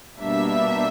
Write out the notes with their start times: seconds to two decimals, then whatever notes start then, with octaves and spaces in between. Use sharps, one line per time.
0.21 B2 G3 A#3 D4 E5